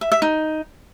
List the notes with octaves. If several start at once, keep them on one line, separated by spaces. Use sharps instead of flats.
E5
E5
D#4